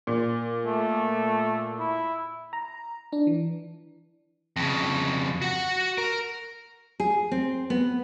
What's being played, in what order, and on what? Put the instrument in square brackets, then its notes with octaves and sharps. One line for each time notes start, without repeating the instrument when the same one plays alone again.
[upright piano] A#2
[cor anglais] A3
E4
[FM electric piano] A#5
D4
E3
[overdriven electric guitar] F2 C#3
F#4 F#5
A#4
[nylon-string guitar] G#4
C4
B3